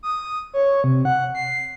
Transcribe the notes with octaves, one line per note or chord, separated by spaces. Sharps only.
D#6
C#5
C3
F#5
C7